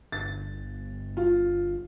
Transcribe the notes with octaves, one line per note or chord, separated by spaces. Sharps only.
G1 A6
F4